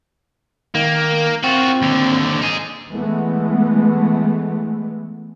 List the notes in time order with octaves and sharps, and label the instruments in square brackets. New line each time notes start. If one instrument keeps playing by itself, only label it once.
[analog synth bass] D#3 [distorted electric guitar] A#3
[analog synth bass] C4 [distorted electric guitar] F4 F#4
[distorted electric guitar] D#2 D3
D#4 G#4
[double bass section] E3 G#3 A3 B3